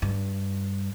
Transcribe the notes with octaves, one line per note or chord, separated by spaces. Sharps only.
G2